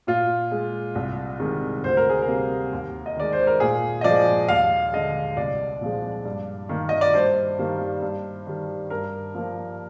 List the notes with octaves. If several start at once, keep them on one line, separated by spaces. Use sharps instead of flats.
A#2 F4
G#3
C2
C3 D#3 G#3
D2 C5
A#4
G#4
A#4
C3 G3 A#3
D#2
D#5
D#3 G#3 D5
C5
A#4
A#2 G#4
D#5
F3 G#3 D5
D#2 F5
D3 G#3 D#5
C2 D5
A#2 F3 G#3
G2
D#3 A#3
D#5
D5
G2 C5
D#3 G3 A#3
G2
D#3 G3
G2 A#4
F3 A#3